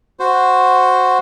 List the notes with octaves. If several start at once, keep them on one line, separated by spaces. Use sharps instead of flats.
F#4 C5